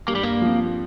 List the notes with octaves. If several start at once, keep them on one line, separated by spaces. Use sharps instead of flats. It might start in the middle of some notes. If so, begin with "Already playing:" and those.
G2 A#3
G3
A#3
F3 C4